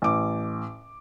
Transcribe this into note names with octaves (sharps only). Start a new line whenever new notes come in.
A1 D6